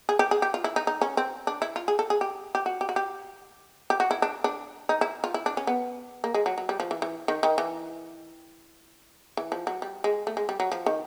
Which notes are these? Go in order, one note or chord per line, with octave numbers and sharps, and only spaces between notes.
G#4
G4
G#4
G4
F4
E4
D#4
D#4
C#4
C4
D4
E4
F4
G#4
A4
G#4
G4
G4
F#4
G4
F#4
G4
G4
F#4
E4
D4
D4
D#4
E4
F4
E4
D4
C#4
B3
A#3
G#3
F#3
F#3
G3
F3
E3
E3
D#3
D#3
E3
E3
F3
F#3
G3
G#3
A3
G#3
G3
F#3
F3
D#3